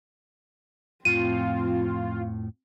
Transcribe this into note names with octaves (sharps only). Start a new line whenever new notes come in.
F2 A2 F3 C4 F4 D#7